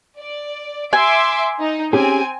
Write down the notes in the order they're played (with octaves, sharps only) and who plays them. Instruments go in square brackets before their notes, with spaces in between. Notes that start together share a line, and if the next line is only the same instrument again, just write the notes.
[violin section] D5
[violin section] E5 C6 D6 [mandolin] G#5
[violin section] D#4
[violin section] C4 G#5 [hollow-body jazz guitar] C#4 G4 G#4